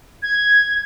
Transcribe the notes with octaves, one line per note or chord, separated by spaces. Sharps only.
G#6